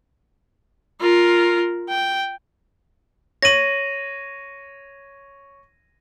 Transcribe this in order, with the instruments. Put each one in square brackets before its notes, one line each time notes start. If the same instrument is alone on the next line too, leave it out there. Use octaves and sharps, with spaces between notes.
[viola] F4 A#4
G5
[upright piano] C#5 F#7 [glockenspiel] A#6 D#7